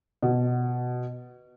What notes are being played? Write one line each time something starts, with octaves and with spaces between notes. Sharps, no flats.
B2